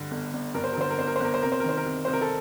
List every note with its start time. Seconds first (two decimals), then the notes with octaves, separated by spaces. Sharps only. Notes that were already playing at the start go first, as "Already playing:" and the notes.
Already playing: G2 D3
0.11 G1
0.33 G1
0.54 G2 A#4
0.64 C5
0.73 A#4
0.77 D3 C5
0.91 A#4
0.98 G1 C5
1.08 A#4
1.16 C5
1.20 G1 A#4
1.34 C5
1.42 C3 A#4
1.52 C5
1.60 A#4
1.64 D#3 C5
1.77 A#4
1.85 C2
2.05 C2 C5
2.13 A#4
2.21 A4